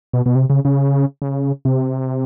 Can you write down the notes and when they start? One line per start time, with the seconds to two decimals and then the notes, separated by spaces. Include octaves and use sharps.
0.13 B2
0.26 B2
0.35 C3
0.50 C#3
0.65 C#3
1.22 C#3
1.65 C3